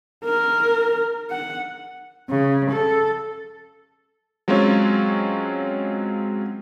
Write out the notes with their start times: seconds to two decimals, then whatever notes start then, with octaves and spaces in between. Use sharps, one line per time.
0.25 A#4
1.30 F#5
2.30 C#3
2.71 A4
4.48 F#3 G#3 C4 C#4 F4 C#5